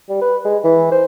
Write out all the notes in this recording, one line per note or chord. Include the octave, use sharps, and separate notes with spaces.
G3
B4
G#3
E3
C5